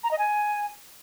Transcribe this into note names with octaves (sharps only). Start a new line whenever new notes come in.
A#5
D#5
G#5